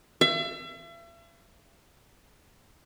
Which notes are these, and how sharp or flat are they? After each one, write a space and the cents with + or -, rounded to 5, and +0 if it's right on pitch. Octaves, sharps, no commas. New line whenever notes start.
E5 +40